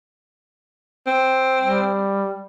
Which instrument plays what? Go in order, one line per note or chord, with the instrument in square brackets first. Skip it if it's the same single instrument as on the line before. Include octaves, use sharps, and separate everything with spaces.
[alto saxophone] C4
[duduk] G3